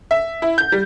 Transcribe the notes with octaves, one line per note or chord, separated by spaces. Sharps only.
E5
E4
G6
G3